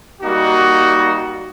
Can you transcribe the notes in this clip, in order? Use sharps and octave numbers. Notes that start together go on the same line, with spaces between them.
G3 A#3 D#4 F#4